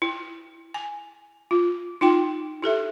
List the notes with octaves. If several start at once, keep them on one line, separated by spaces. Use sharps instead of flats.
E4
G#5
F4
D#4 F4 G5 C6
E4 G4 A4 E5